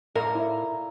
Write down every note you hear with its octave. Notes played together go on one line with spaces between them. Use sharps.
A2 A#4 D5 F5 A#5
E4